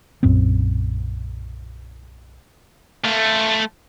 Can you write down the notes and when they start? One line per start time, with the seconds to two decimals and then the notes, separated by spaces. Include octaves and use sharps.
0.23 B1 F#2 A#2 C4
3.04 A3 F4